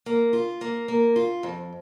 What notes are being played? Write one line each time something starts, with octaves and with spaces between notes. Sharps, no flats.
A#3
F4
A#3
A#3
F4
F2